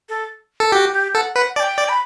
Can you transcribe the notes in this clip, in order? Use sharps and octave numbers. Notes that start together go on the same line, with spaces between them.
A4
A4
F#4 G4
G4
A4 F#5
B4 F#5
D5 A5
G5
D5
B5